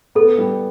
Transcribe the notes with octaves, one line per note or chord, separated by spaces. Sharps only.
B3 A4
G3